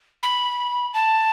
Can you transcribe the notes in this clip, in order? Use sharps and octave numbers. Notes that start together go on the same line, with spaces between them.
B5
A5